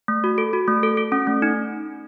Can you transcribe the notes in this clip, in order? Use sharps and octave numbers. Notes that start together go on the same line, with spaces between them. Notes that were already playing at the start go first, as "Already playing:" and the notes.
A3
F#4
A4
F#4
A3
A4
A4
C#4
A3
D#4